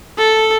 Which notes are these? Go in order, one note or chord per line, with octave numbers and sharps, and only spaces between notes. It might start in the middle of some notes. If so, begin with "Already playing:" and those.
A4